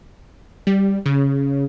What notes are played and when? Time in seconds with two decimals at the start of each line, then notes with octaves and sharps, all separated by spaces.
0.67 G3
1.06 C#3